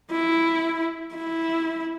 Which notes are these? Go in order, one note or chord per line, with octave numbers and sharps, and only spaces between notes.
E4
E4